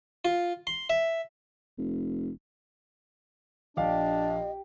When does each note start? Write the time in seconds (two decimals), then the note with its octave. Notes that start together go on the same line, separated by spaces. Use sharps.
0.25 F4
0.67 C6
0.90 E5
1.78 F1
3.77 A#1 D4 G4 D#5 F5